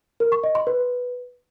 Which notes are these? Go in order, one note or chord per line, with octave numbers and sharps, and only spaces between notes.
A#4
C#6
D#5
C6
B4